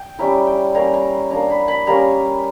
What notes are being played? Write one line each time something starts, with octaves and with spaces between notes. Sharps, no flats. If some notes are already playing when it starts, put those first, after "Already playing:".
Already playing: G5
G3 C#4 E4 A#5
G5
G3 A#3 C#4 A#5
A#5
A#3 D4 A#5
B5
B5
G3 A#3 C#4 A#5